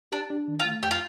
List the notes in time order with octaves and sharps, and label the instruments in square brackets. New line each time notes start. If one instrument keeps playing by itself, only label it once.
[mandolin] D4 [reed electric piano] G4
[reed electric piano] D4
D#3
[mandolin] F4
[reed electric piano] A3
[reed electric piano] F2 [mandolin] G4
[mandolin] F4